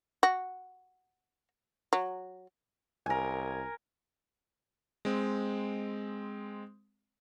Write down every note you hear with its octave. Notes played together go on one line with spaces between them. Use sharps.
F#4
F#3
C2 A#4 G#5
G#3 C4